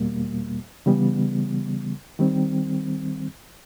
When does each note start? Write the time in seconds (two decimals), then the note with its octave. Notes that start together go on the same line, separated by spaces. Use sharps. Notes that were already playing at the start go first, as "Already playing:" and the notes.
Already playing: E2 B2 G3 A#3
0.86 C#3 E3 G3 B3
2.19 D#3 G3 C4